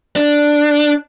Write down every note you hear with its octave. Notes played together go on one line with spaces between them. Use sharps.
D4